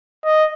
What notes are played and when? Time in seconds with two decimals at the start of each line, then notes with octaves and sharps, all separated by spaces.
0.25 D#5